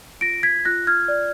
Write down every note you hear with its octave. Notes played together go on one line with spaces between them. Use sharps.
F4 A#6 D7
G#6 B6
F4 F#6 A#6
F6 G#6
D5